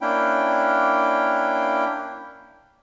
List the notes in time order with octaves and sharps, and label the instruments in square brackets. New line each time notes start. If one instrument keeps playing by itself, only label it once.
[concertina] A#3 C#4 D4 E4 G5